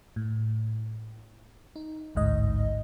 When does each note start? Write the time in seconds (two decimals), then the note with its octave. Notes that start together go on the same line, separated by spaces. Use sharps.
0.16 A2
1.76 D#4
2.15 A1 D2 G#2 D#5